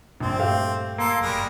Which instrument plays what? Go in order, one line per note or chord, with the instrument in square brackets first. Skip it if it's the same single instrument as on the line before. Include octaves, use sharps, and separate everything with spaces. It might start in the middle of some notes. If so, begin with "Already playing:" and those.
[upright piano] A#1 [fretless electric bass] G2 A#2 [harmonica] C4
[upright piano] A3 G4 F5
[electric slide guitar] A#3 [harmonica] A4 C6
[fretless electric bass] F#1 [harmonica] G3 G#3 A#4